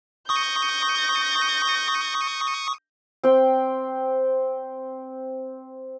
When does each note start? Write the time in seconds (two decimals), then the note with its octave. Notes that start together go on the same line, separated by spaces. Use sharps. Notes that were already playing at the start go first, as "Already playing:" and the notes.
0.29 C#6 D#6 G6 A#6
3.24 C4 G5